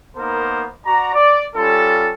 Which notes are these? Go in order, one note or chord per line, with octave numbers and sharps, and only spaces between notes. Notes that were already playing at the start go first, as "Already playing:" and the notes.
A#3 B3 D#4 A#4 C5
F#4 D5 A#5
D5
G3 C#4 F4 A4